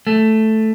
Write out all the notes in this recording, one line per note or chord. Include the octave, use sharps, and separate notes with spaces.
A3